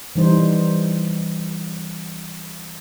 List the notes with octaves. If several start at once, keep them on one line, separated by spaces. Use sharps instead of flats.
E3 G3 D#4 C5